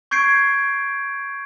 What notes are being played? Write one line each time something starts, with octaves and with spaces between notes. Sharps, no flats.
C#6 G6 G#6 C7 D7